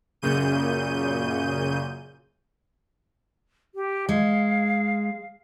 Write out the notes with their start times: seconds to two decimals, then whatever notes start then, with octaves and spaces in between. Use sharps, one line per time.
0.22 F#2 A#2 C#3 G6 D#7
3.75 G4
4.09 G#3 F5